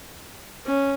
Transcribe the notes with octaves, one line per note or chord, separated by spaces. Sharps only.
C#4